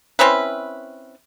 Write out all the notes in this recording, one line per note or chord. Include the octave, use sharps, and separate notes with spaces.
C4 C#4 E4 B4